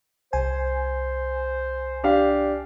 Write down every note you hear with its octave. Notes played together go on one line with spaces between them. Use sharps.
C2 C5 G#5
D4 G4 F5